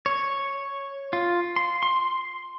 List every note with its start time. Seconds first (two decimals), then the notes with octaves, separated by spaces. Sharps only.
0.06 C#5
1.13 F4
1.56 C6
1.83 C6